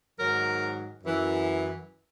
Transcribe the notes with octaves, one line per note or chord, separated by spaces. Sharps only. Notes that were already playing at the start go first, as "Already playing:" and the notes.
G#2 D#3 F#3 A#4
F#2 E3